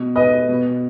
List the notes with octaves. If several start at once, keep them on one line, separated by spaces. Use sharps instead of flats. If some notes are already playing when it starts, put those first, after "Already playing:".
Already playing: B2
B4 D#5
B2